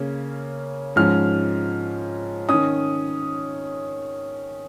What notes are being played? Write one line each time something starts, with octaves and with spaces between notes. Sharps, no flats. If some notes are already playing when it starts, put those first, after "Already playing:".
Already playing: C#3 A#3 C#4
G#2 F3 C#4 F6
D#3 C#4 D#6